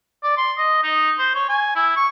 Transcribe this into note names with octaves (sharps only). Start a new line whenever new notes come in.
D5
C6
D#5
D#4
C5
C#5
G#5
E4
C#6